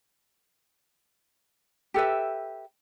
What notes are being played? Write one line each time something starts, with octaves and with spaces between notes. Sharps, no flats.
G4 A4 B4 E5